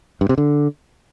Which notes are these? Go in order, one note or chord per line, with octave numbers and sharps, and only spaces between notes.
G2
C3
D3